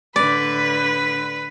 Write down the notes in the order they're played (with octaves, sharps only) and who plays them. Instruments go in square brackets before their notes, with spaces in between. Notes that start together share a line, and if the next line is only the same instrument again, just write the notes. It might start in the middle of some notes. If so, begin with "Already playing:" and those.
[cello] A2 D3 [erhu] B4 [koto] D5